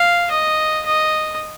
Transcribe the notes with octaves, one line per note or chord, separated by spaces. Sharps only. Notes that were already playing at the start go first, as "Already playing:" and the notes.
Already playing: F5
D#5
D#5